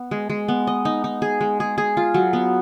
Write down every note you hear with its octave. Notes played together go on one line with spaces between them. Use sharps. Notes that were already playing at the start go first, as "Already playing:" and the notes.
Already playing: B3
G#3
G#3
B3
D#5
D#4
D#4
G#4
G#3
G#4
G#4
F4
F#3
B3